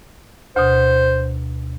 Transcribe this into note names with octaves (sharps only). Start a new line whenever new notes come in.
D2 B2 C5